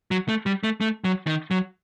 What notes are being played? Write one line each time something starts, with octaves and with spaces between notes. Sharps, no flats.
F#3
A3
G3
A3
A3
F#3
D#3
F#3